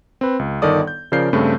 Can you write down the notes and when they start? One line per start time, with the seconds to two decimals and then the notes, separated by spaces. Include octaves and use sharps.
0.21 C4 B4
0.39 C#2
0.62 G1 D#3 D#4 A4 D5 D#6
0.87 G6
1.12 C#3 F3 A#4 D5 G6 C7
1.33 G2 C#3 A3 C4